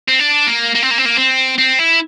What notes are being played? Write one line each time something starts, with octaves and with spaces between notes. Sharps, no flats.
C4
D4
A#3
A#3
C4
A#3
C4
A#3
C4
C4
E4